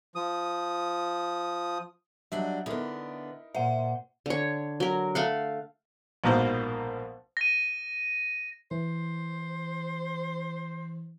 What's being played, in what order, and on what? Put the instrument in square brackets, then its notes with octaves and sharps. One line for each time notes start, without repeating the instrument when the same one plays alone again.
[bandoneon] F3 D#6
[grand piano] F#3 D#5 E5 [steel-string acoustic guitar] G3 D4 F#4
[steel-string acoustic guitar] D3 B3 [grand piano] D#4 E4 A#4
[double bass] A#2 [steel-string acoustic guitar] C5 [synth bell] E5 F#5
[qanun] D3 C#5
F#3 A#4
A3 F5 F#5
[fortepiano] A#1 G#2 B2 A#3 A#4 C5
[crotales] A#6 D#7
[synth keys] E3 [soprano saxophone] C5